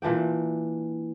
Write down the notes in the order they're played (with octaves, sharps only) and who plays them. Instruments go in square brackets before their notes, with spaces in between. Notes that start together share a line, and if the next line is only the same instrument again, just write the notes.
[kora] A#2 E3 D4 G5